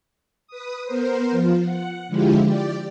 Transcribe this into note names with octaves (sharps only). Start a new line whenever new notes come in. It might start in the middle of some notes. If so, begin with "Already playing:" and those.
B4 D#6
B3 A#4 C5
F3 F4
F#5
D3 F3 G#3 E4 F4 G4
G4 D5